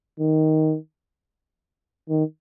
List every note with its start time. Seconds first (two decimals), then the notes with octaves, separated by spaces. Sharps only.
0.20 D#3
2.10 D#3